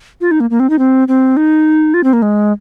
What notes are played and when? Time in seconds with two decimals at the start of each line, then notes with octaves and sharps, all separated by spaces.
0.21 F4
0.31 D#4
0.40 A#3
0.50 A#3
0.60 C4
0.70 D#4
0.79 C4
1.08 C4
1.37 D#4
1.94 F4
2.04 C4
2.13 A#3
2.22 G#3